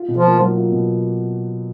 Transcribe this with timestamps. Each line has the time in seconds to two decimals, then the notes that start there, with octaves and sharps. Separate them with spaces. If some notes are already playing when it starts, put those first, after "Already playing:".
Already playing: F4
0.08 B2
0.16 F3
0.24 A#3
0.39 F#3
0.57 F4
0.72 B2